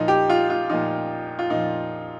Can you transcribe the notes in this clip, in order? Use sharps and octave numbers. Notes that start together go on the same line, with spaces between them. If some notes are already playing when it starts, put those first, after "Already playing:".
Already playing: A#2 F3 D#4
G4
F4
F4
A#2 F3 D#4
F4
A#2 F3 D#4